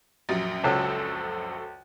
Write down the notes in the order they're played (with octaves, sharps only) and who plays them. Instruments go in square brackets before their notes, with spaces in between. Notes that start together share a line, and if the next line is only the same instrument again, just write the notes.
[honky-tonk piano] A#1 F#2 F#3 [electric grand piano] A6
[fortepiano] C#2 [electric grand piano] F#4 A4 C5